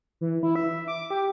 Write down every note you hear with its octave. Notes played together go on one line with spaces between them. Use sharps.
E3
E4
E5
D6
G4